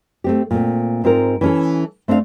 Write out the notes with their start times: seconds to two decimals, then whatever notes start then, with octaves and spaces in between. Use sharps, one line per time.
0.24 A3 C4 G4
0.51 A#2 A3 C4
1.04 G#2 C4 F4 A#4
1.41 E3 C#4 A4
2.08 A3 C4 D4 D5 F5